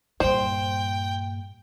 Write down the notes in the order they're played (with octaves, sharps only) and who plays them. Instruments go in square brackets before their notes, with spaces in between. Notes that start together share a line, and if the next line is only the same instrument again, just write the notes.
[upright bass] G2 A#2 [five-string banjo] C5 [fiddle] G5